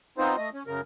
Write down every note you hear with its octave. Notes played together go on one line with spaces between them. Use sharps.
B3 C4 D#4 F4 C5
A3 D#5
C#4
F#2 C#3 A#4